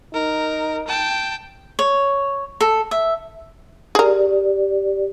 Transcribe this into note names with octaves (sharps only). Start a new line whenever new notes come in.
D#4 A#4
G5 A5
C#5
A4
E5
G4 G#4 A#4 D5